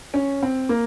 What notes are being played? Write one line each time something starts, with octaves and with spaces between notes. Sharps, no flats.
C#4
C4
A#3